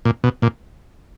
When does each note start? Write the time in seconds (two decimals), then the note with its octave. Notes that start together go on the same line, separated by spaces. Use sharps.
0.05 A#2
0.24 B2
0.42 A#2